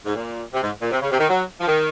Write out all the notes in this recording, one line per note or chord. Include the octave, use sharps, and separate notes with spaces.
G#2
A#2
C3
G#2
A#2
C3
C#3
C3
D#3
F#3
F3
D#3